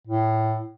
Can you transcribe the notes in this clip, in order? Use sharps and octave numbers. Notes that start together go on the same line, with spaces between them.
A2